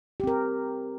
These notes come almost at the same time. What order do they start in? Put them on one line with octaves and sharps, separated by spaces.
G4 C4 A#4